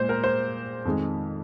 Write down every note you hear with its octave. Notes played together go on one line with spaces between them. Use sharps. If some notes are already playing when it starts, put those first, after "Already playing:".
Already playing: A#2 G#3 C5
A#4
C5
F2 D#3 G#3